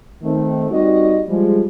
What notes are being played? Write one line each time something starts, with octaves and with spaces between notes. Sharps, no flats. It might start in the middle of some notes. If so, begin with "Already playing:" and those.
D#3 A3 C4
G3 C4 D#4 F#4 D5 D#5
F3 G3 G#3